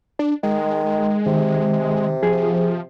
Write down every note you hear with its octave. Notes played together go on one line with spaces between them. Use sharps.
D4
D#3 G#3
C3 D#3
F3 G#4